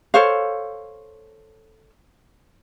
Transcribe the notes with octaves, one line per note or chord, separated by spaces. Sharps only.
A4 C5 C#5 F5